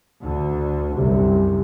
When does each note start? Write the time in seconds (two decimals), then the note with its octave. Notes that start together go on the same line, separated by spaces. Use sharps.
0.22 D2 D3
0.96 C2 F#2 C3